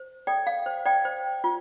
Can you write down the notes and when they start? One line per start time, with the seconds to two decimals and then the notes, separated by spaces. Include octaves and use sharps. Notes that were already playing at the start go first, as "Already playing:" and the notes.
Already playing: C5
0.27 A4 D5 G5
0.47 F5
0.66 C5
0.86 D5 G5
1.05 C5
1.44 F4